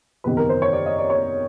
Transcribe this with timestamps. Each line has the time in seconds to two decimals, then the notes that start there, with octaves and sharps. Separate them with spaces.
0.24 F#1 E2 C3 D#3 B4
0.37 A#4
0.49 C5
0.62 C#5
0.73 D5
0.86 D#5
0.99 D5
1.10 C#5